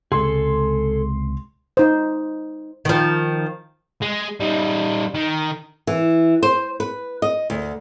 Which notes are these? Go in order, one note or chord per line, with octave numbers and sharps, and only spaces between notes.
C#2 C3 G#3 G#4 A4 C6
D#4 C5
D#3 F3
G#3
G3 D#4
D#3
E3
C5
B4
D#5
D2